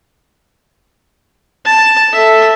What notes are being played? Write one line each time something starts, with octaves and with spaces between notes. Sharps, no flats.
A5
A4 E5